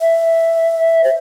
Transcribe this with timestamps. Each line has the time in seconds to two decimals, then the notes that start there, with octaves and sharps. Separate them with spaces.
0.01 E5
1.04 C5